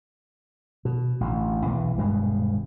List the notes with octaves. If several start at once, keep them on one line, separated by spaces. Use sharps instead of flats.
B2
A1 D2
B1 E2 E3
D#1 G2 B2 G#3